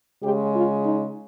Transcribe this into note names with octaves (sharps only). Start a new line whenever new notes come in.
C#3 G#3 G4
F4
D#4